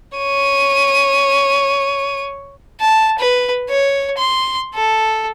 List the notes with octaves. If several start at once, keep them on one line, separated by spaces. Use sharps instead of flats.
C#5 D#7
A5
B4
C#5
C6
A4